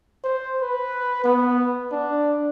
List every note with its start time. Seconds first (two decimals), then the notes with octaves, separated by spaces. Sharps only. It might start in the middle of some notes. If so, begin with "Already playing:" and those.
0.24 C5
0.62 B4
1.24 B3
1.92 D4